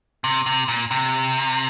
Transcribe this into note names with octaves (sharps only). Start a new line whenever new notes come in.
C3
C3
A#2
C3